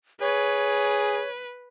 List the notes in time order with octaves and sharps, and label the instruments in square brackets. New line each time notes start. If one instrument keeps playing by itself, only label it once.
[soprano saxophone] G#4 [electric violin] B4 [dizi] C#5